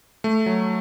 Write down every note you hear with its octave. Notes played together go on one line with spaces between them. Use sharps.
A3
F#3